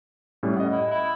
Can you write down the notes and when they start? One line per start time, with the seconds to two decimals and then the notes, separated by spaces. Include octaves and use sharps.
0.43 A2 G3 C#4
0.57 D#5 F#5
0.72 E4
0.91 E4